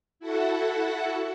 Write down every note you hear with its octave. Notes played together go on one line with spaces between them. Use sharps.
E4 F#4 A4 F#5